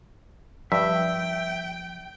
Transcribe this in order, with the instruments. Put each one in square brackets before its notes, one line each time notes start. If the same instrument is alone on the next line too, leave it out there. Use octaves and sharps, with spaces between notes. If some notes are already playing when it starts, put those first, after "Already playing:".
[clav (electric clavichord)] G2 [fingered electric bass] F3 [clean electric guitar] E5 [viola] G5